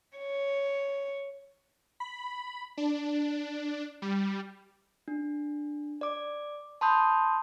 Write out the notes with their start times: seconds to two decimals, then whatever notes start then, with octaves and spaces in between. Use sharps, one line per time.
0.17 C#5
2.00 B5
2.77 D4
4.02 G3
5.08 D4
6.01 D5 D6
6.81 A5 B5 C6 D#6 G6